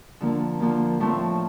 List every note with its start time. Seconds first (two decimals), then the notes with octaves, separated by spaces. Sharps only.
0.21 D3 F3 A#3
0.60 D3 F3 A#3
1.00 A2 F3 A3 C4